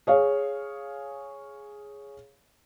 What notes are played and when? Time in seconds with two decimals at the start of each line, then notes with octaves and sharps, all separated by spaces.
0.07 G#4 C#5 F5